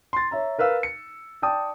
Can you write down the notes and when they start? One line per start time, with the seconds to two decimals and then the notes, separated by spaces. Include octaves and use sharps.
0.13 C6 A6
0.31 C#5 E5 A#5
0.58 A#4 B4 F5 E6
0.83 C#7
1.42 D5 G5 A5 D#6